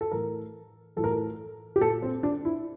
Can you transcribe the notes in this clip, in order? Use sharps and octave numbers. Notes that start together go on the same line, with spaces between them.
A4
A2 E3 A#4
A2 E3 A4 A#4
A4
G4
A#2 A4
C4
D4
E4